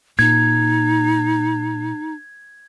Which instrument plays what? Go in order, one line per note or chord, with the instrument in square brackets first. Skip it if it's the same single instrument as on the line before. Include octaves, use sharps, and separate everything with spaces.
[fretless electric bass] A#2 [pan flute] D#4 [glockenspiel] G#6